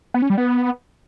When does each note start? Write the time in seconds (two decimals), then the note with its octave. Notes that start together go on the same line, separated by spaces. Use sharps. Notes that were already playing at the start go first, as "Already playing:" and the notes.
0.14 B3
0.22 C#4
0.30 G3
0.38 B3